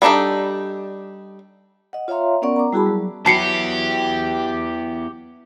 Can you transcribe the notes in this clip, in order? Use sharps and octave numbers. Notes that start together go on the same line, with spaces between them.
G3 B3 D4 D#4 A4
D#5 F#5
F4 C#5 E5 F5 A#5 C6
B3 C#4 A#4 D5 F#5 C#6
A#5 D6
G3 E4 F#4 G#4 A5 B5
F#3
F#3 B3 E4 G4 A5 B5 C7 C#7